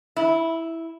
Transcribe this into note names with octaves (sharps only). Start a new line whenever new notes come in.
E4